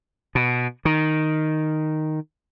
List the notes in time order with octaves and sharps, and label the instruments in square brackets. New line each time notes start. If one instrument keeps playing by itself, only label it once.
[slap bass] B2
D#3